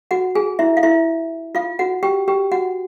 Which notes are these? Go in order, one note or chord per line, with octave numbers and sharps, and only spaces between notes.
F#4 F#5
G#4 G#5
E4 E5
F5
E4 E5
F4 F5
F#4 F#5
G4 G5
G4 G5
F#4 F#5